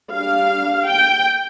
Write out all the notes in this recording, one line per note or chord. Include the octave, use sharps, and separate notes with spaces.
G3 D4 F5
G5